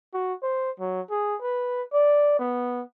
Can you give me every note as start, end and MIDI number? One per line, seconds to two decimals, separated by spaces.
0.14 0.34 66
0.43 0.71 72
0.80 1.01 54
1.11 1.36 68
1.42 1.84 71
1.93 2.37 74
2.39 2.82 59